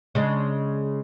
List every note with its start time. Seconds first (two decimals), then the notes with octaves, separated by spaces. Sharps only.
0.15 C#3 G#3 D4